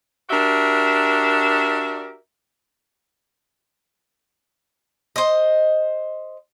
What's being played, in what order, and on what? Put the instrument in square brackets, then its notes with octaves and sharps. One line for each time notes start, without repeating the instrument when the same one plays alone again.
[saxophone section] D4 F#4 G4 A#4 E5
[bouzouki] C5 D#5